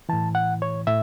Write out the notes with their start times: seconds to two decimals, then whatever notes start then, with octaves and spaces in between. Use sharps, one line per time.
0.09 A2 E3 A5
0.35 F#5
0.62 C#5
0.87 A2 E5